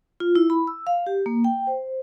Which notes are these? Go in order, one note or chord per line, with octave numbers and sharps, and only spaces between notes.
F4
E4
B5
E6
F5
G4
A#3
G5
C5